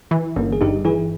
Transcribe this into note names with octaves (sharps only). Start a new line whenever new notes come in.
E3
G1 A#3 C#4
G#4
G2 D#4 G4
E3 E4 G#4